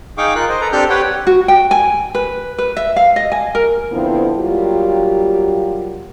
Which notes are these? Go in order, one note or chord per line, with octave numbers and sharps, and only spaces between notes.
D#4 G#4 F5 G5 C#6 D6
F4 A#4 F#6
C5 D#5
A4 B4 A#5
C4 D4 G4 A4 F6 G6
G4 B4 C#5 F#5 G5
F#4
G5
G#5
B4
B4
E5
F5
D#5
G#5
A#4
D3 F3 B3 C4 E4
F#3 G3 A#3 F4 G4